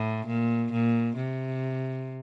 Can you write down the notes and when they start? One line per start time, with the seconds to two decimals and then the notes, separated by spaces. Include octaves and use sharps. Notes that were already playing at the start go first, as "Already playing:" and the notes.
Already playing: A2
0.27 A#2
0.72 A#2
1.16 C3